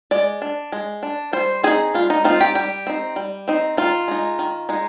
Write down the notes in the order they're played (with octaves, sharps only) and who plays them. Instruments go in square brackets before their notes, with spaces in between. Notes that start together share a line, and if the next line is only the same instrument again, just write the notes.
[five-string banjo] G#3 D5
D4
G#3
D4
G3 C5
C4 D#4 G#4
G3 F4
D#4
C4 D#4 F4
G4
G3 G4
C4 D#4
G3
C4 D#4
D#3 F4
G#3 D#4
D#3
G#3 D#4